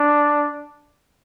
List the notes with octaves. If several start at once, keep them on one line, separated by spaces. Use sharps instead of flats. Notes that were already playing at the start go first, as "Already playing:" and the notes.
Already playing: D4